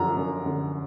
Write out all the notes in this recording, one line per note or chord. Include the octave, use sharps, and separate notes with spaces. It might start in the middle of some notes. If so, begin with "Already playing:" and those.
Already playing: F#2 D3 F3 A#5
F#2
D3